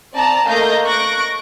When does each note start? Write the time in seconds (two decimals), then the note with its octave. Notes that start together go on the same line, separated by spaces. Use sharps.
0.13 C4 D5 A5 A#5
0.47 A3 A#3 D#5 F5 G6 A#6
0.84 C#6 F#6 A#6 D7